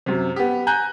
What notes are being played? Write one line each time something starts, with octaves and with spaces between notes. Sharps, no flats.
F#2 C3
B3 G4
G#5 A#5 F#6 G6